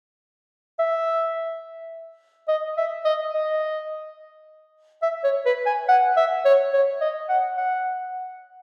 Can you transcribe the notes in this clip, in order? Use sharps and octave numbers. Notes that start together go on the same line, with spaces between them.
E5
D#5
E5
D#5
D#5
E5
C#5
B4
G#5
F#5
E5
C#5
C#5
D#5
F#5
F#5